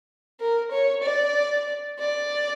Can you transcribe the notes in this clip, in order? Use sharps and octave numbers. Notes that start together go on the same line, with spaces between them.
A#4
C#5
D5
D5